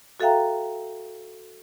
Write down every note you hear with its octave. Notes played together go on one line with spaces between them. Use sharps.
F#4 A4 E5 F5 G5 A#5